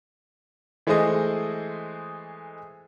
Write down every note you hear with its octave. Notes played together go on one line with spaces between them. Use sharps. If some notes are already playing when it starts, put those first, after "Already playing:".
E3 G#3 A3 G#4 C5 D#5